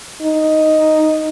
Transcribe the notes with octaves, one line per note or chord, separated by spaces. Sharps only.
D#4